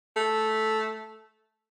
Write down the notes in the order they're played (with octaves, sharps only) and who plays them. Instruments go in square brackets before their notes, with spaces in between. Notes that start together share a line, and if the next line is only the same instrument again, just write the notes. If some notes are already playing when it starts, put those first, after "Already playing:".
[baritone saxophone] A3